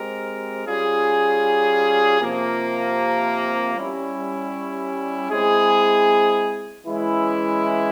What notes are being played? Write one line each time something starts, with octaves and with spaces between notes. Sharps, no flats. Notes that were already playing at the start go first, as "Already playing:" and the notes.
Already playing: G#3 C4 G4 A#4
G3 C#4 F4 G#4
C3 F3 A#3
G3 C#4 E4
G#3 C4 E4 G#4
E3 G#3 C#4 E4